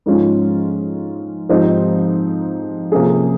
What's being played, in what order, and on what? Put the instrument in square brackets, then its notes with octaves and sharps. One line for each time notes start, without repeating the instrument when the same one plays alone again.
[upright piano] G#2 F3 G#3 C#4 F4
G#2 F3 C4 D#4 G4
C3 F3 A#3 C#4 G#4